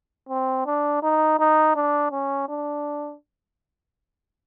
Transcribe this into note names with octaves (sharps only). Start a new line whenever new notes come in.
C4
D4
D#4
D#4
D4
C#4
D4